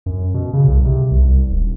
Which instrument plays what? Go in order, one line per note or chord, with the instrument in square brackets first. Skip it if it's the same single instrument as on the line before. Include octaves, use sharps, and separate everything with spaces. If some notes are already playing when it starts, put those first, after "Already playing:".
[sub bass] F#2
B2
C#3
C2
C3
C2
C2
D#1